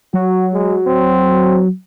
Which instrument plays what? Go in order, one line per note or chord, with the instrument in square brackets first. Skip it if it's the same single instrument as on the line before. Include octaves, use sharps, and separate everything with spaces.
[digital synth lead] F#3 [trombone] F#4
[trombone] G#3
C4